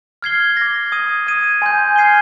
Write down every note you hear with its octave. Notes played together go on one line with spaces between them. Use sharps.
F6 G#6 C7 G7
D6 F6 A#6
D#6 G#6 D#7
D#6 G#6 D#7
G#5 C6 G6
F6 G#6 C7 D#7 G7